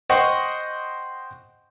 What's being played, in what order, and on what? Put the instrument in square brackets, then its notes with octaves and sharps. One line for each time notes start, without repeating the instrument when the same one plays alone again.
[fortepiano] C5 D#5 F#5 G5 C6 C#6